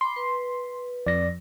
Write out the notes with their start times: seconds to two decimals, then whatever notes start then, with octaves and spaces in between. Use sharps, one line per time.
0.01 B5 C6 D6
0.16 B4
1.07 F2 D5 A#6